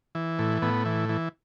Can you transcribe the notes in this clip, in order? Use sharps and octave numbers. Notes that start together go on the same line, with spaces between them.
E3
A2
A2 B3
E3
E3